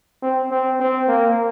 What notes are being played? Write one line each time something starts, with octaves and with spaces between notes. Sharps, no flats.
C4
C4
C4
A#3